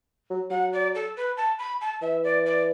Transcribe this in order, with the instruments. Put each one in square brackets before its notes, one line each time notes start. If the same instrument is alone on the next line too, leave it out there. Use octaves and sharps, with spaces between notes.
[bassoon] F#3
[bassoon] F#3 [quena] F#5
[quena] D5
A4
B4
A5
B5
A5
[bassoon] E3 [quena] E5
[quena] D5
D5